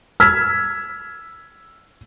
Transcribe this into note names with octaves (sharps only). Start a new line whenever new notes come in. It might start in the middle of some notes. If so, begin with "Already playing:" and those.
E6 F6 G#6 B6